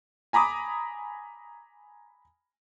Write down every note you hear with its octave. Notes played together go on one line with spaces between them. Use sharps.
G#5 A#5 B5 D6 D#6